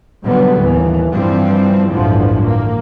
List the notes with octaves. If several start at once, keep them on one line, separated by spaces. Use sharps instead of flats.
B2 D3 F#3 G3 B3
D#2 A2 E3
G2 E3 F3 G3 C4
G1 D2 A2 D3 E3 F3
A#3